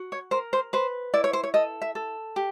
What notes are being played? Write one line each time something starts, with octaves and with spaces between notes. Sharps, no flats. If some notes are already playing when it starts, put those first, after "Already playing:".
Already playing: F#4
C#5
A#4 C5
C5
B4 C5
E4 D5
C#5
C5
C#5
A4 D#5
E5
A4
G4